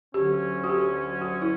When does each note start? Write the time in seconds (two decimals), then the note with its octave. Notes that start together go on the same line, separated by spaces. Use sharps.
0.14 D2 D3 F#3 C#4 G4
0.64 F#4
0.69 G4
1.21 F#4
1.42 E4